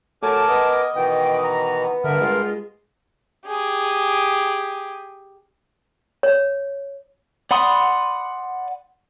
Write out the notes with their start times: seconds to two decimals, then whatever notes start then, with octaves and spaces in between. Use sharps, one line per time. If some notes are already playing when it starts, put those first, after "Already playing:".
0.22 F#3 A3 A#4 G#5 A5 D6
0.49 B3 D#5
0.95 B2 D#3 E3 B3 G5
1.43 A#5
2.04 G2 D3 A#4 E5
2.21 G#3 F4
3.47 G4 G#4
6.23 C#5
7.51 D5 F#5 B5 C6 D#6